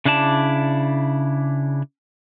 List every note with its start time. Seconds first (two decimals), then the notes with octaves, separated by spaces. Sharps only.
0.05 C#3 D4 E4 D5 A5